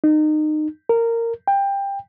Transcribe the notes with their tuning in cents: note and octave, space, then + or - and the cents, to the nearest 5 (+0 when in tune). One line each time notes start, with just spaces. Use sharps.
D#4 -25
A#4 -15
G5 +20